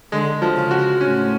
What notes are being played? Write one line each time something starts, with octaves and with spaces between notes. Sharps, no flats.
D3 G#3
F3
C#3
F#4
A2 C#4